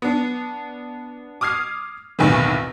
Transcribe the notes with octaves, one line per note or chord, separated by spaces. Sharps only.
B3 D4
D6 D#6 F6 G#6 C7
B1 E2 A2 C3 D#3 E3